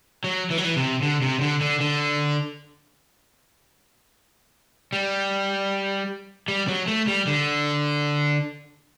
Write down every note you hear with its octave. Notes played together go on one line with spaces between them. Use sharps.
F#3
E3
F#3
E3
C3
D3
C3
D3
D3
D3
G3
G3
F#3
A3
G3
D3